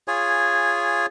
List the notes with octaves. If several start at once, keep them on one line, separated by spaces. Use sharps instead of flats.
F4 G#4 C#5 G#5